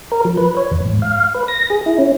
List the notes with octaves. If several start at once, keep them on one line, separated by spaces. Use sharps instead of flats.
A#4
F3
B4
C#5
E2
G#2
F5
B4
A#6
G#4
E4
C#4